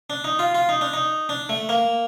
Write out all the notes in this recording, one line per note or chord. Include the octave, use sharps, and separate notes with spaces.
D4
D#4
F4
F4
D#4
D4
D#4
D4
A3
A#3